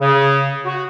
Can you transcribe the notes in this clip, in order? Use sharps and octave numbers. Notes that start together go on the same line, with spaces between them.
C#3
F#4